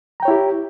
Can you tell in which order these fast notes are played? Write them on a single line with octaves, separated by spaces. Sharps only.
A#5 G5 C#5 E4 G4